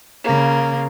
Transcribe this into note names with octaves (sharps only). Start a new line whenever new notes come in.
C#3 A#3